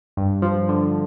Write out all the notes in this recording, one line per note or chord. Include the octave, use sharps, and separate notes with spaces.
G2
F3
D3